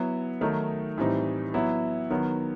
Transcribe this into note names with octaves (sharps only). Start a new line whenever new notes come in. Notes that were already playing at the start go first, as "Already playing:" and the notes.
Already playing: F#3 B3 E4
D#3 F#3 A3 D#4
A2 E3 G3 C4 D#4
F#3 B3 E4
D#3 F#3 B3